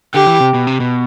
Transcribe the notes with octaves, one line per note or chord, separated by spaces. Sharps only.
D3 G4
E3
C3
B2
C3
B2